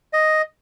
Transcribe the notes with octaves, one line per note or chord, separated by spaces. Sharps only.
D#5